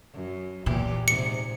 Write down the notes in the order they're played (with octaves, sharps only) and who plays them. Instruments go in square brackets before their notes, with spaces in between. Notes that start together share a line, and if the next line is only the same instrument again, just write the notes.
[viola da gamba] F#2
[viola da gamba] E2 E3 G4 [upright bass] A#2
[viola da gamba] G#2 C3 [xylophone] C#7